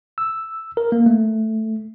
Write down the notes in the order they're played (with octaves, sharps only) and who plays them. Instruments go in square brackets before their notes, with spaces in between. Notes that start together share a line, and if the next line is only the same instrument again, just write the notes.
[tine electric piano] E6
A#4
A#3
A3